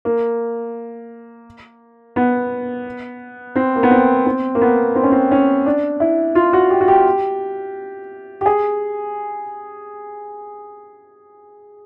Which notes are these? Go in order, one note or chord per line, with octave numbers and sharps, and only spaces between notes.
A#3
B3
C4
A#3
B3
C4
C4
A#3
B3
C4
C#4
C4
C#4
D4
E4
F4
F#4
G4
F#4
G4
G4
G#4